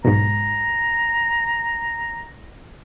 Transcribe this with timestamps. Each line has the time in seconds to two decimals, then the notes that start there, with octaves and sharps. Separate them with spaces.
0.04 B1 G#2 A#5